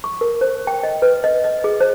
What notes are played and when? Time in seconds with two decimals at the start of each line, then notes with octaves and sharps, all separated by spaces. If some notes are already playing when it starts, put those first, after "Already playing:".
0.04 C#6
0.21 A#4
0.41 C5
0.67 G5
0.83 D#5
1.02 B4
1.24 D#5
1.44 D#5
1.64 G#4
1.80 C5